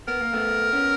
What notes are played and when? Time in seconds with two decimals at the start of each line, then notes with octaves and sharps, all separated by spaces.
0.08 B3 A#4
0.21 A#3
0.33 A3 B3
0.73 B3 C#4